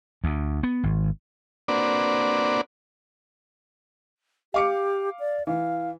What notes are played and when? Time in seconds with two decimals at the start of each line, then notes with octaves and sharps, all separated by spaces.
0.24 D2
0.63 B3
0.83 G#1
1.68 A#3 C4 D4 F#4 B4 D5
4.54 G4 F5 D6 C#7
5.19 D5
5.47 E3 F5